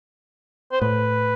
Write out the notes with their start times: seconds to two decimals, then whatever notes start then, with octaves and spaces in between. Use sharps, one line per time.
0.72 C5
0.81 A2 B4